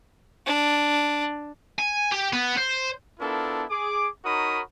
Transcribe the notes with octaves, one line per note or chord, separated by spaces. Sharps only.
D4
G#5
G4
B3
C5
B3 D4 E4 F4 A4 A#4
G#4 D6
D#4 F#4 A#4 C#5 B5 D#6